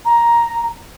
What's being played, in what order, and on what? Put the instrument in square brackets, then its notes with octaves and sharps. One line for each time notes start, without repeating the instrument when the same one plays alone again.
[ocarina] A#5